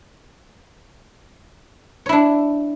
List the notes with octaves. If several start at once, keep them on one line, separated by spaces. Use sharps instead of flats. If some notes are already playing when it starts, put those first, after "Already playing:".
D4 E4 C#5